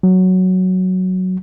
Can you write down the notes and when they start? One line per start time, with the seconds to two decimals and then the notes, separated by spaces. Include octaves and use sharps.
0.03 F#3